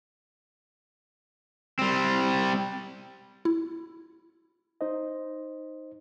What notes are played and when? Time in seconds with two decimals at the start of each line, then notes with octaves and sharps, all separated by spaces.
1.79 G3 C4
3.45 E4
4.81 D#4 C5 D#5